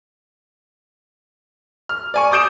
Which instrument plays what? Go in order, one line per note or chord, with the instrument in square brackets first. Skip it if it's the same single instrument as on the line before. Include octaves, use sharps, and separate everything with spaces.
[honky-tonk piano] F6
D5 G#5 C#6
D6 D#6 G6 D7 E7